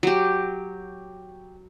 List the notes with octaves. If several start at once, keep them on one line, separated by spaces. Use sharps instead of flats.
F#3 G4